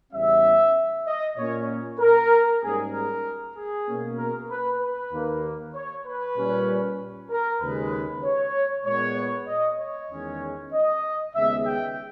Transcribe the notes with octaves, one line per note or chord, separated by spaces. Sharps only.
E2 C#3 G3 C#4 E5
D#5
A#2 A#3 C#4 C#5
A#4
G#2 G3 A#3 C#4 G#4
A#4
G#4
B2 A#3 C#4
A#4
B4
B4
D#2 D#3 A#3
C#5
B4
A#2 G3 C#4
A#4
D#2 C#3 G#3 B4
C#5
A#2 G#3 B3 C#5
D#5
C#5
E2 D#3 G#3 C#4
D#5
D#2 C#3 G#3 B3 E5
G5